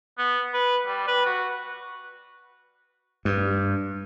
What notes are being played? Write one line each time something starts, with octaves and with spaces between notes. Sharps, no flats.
B3
B4
G3
B4
F#4
G2